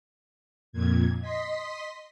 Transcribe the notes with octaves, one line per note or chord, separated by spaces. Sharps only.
F2 A#2 G#6
D#5 C6 B6